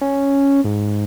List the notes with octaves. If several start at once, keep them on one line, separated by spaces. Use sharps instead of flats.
C#4
G#2